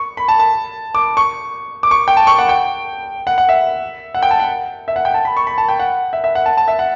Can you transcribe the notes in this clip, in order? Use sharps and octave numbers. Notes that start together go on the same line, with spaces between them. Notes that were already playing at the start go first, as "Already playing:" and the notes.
Already playing: C#6
B5
A5
A5
D6
C#6
D6
C#6
G5
A5
C#6
F#5
G5
F#5
F#5
E5
F#5
G5
A5
F#5
E5
F#5
G5
A5
B5
C#6
B5
A5
G5
F#5
E5
E5
F#5
A5
A5
E5
F#5